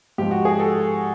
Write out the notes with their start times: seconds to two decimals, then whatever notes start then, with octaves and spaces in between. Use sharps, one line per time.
0.18 G#2 F3 G4
0.31 F#4
0.45 G#4
0.60 A4